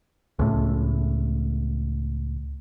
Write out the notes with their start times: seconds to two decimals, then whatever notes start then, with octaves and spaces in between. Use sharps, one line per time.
0.39 C#2 A2